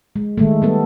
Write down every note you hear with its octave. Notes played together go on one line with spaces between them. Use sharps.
G#3
D#3 G#3 A3
G3 B3 A4